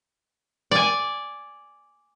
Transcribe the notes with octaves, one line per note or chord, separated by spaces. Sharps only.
D5 G#5